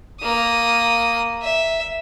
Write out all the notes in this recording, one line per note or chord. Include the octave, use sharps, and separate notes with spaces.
A#3 D#6
E5